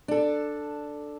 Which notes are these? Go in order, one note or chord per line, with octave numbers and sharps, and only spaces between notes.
D4 A4